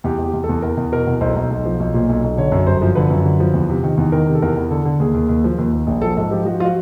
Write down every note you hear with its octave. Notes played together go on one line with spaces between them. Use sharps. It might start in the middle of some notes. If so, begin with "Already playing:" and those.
E2 G4
E2
G4
E2
A4
E2
E2 A#4
E2
B2 A#4
E2
B1 C5
B1
B1
F3
B1
A#2
B1
B1
D3 C#5
F#2
G1 C5
F3
D3 B4
F#2
D3
F3
E2
C3
D#3
E2
D#3 A#4
C3
A4
E2 A#4
E2
D3 A4
D3
D#2 G#4
D#2
D#2
F3
D#2
D#2
A#1
F3 A4
G#2 A4
F3 G4
F3 F#4
F3 F4 F#4